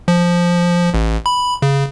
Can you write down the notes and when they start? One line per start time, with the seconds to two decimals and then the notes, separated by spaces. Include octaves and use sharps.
0.08 F3
0.94 A1
1.26 B5
1.62 C#3